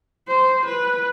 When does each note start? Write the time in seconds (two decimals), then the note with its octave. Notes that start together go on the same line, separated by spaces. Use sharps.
0.28 C5
0.65 B4